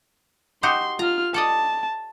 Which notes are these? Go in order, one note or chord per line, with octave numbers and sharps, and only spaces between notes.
D#4 F#4 G4 C6
F4 A#5 F6
A4 D5 D#5 A5